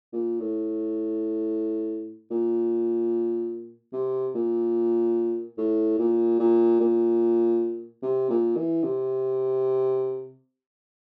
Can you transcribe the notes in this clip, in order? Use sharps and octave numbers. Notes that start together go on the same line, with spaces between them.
A#2
A2
A#2
C3
A#2
A2
A#2
A#2
A#2
C3
A#2
E3
C3